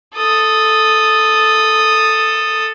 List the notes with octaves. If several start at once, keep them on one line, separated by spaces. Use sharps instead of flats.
A4 D#6